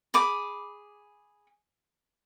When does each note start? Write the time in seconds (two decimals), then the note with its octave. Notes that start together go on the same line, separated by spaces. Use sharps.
0.14 G#4 B5 D6